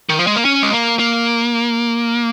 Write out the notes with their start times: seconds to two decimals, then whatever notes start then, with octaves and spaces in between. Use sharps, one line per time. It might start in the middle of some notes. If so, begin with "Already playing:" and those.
0.09 D#3
0.18 F3
0.27 G#3
0.36 A#3
0.45 C#4
0.62 G#3
0.72 A#3
0.99 A#3